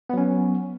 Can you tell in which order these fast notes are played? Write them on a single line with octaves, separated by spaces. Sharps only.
B3 F#3 C#4